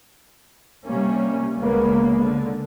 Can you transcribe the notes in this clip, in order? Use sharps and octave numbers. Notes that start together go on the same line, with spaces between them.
C3 G3 A#3 C#4
C#2 C#3 G#3 A#3 B3
D3